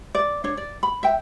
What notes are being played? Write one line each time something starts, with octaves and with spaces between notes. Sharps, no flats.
D5
D4 C#5
D5
B5
E5 G5